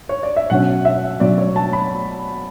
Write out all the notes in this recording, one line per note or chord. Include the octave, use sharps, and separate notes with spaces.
C#5
D5
E5
B2 F#3 C#4 F#5
E5
B2 F#3 C#4 D5
C#5
A5
B5